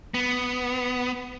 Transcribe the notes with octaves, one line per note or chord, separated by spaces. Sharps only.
B3